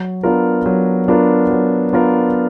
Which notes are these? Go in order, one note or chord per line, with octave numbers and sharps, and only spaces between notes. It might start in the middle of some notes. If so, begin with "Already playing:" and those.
Already playing: F#3
B3 D4 F4 A#4
F#3
B3 D4 F4 A#4
F#3
B3 D4 F4 A#4